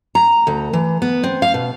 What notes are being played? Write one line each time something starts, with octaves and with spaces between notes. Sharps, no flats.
A#5
D2
E3
B3
C4
F5
B2